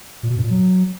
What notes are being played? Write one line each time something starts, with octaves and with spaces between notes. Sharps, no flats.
A#2
B2
G2
A#2
F#3